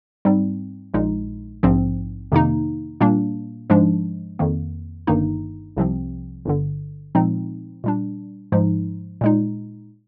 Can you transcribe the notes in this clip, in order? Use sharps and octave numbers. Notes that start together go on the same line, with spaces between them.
G#2 G3 C4 D#4
A#1 A#2 G#3 D#4
A#1 G#2 F3 C4
F2 C3 D#3 A#3 D#4
A#2 G3 A#3 D4
G#2 F3 G#3 D4
F2 D#3 A#3
G1 G2 D#3 A#3 D#4
C2 C3 F3 C4
G1 G2 D3
A#2 F3 G#3 C4 D#4
A#2 G3 D4
G#2 F3 G#3 D#4
A#2 G#3 D#4